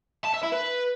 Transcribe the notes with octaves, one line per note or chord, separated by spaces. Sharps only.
A5
E5
E4
B4